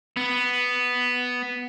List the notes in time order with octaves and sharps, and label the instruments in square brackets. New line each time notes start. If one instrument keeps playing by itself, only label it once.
[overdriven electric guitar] B3